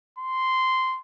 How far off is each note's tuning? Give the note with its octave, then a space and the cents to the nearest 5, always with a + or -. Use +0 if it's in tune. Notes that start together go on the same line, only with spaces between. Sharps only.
C6 -10